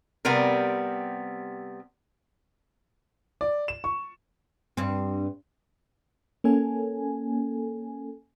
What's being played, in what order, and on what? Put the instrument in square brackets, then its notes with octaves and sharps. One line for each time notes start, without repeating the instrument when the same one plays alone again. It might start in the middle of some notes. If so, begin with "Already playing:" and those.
[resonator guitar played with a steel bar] C3 G3 B3 C4 A#4
[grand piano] D5
E7
C#6
[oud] G2 C4
[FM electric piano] A#3 C#4 A4 G#5